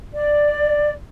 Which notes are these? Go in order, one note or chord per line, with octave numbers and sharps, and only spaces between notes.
D5